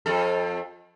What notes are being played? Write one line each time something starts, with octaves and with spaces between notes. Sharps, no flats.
F2 A4